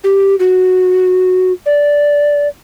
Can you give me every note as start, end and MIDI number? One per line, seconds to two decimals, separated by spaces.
0.04 0.35 67
0.39 1.52 66
1.66 2.48 74